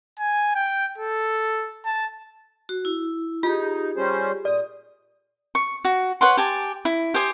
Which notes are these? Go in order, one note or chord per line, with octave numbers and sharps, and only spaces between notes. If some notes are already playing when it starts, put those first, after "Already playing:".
G#5
G5
A4
A5
F#4
E4
D#4 F4 G4 G#4
G3 C#4 C5
A#2 D5 D#6
C#6
F#4
B4 C#5 F#5 C6
G4 G#5 A5
E4
G4 C5 G#5 D#6